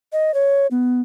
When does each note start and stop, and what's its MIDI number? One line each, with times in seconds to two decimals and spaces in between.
0.13 0.34 75
0.34 0.67 73
0.71 1.01 59